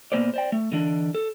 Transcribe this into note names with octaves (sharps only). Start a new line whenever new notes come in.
A#2 A#3 B3 C5 D5
C5 D5 G5
A3
D3 E3 D4
A4